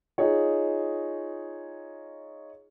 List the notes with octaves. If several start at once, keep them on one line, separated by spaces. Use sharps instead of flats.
D#4 F4 G#4 C#5